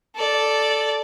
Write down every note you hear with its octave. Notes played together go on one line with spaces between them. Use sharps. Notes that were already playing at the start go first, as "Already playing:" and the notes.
A4 D5